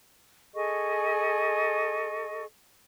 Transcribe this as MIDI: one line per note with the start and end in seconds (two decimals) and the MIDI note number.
0.55 2.45 68
0.55 2.45 69
0.55 2.45 75
0.55 2.45 85